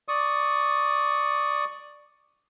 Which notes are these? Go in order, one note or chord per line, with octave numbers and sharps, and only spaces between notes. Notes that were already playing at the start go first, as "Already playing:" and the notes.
D5 C#6 D#6